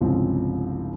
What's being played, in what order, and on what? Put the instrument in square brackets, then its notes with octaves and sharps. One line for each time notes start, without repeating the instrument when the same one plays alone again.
[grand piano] G1 C2 C#3 F3 G#3 C4